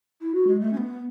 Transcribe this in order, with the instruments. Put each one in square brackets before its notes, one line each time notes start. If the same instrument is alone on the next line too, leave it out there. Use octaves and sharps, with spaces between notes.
[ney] E4
F#4
G#3
A3
C#4
B3